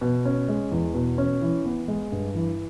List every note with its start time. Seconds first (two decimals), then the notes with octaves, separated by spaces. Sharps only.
0.01 B2
0.25 C#4
0.48 G#3
0.72 E2
0.94 B2
1.18 C#4
1.41 E3
1.65 B3
1.88 G#3
2.12 G2
2.35 E3